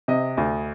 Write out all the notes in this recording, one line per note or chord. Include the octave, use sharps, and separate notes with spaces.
C3 D#5
D2